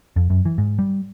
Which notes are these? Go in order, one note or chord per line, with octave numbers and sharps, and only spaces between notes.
F2
F#2
E3
G#2
G3